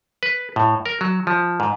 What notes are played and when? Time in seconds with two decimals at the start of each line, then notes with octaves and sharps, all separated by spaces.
0.23 B4
0.56 A2
0.86 A#4
1.01 F#3
1.27 F3
1.60 G#2